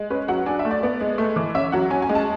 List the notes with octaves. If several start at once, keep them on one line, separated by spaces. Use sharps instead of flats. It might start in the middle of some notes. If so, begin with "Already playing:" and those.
Already playing: G#3
C#4 B4
F#3 F#5
D4 G#5
E5
A3
D5
B3
G#3
A3
E3
C#4 E5
F#3 F#5
C#4 G#5
G#5
G#3
A5